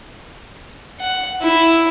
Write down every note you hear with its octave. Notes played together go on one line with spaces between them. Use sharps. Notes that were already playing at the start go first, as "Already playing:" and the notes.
F#5
E4